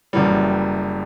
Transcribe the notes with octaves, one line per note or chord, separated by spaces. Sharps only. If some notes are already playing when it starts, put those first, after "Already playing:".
F#1 F#2 E3 G3